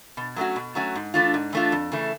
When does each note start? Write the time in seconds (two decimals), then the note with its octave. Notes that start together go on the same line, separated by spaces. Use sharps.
0.17 B2
0.36 F#3 A3 C#4 F#4
0.56 B2
0.75 F#3 A3 C#4 F#4
0.95 G#2
1.14 E3 A3 D4 F4
1.34 G#2
1.53 E3 A3 D4 F4
1.72 F2
1.92 C#3 E3 A3